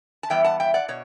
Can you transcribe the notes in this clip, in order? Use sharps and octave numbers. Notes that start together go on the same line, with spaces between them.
A5
E3 G3 B3 E5 G5
F#5 A5
E5 G5
D5 F#5
B2 C#5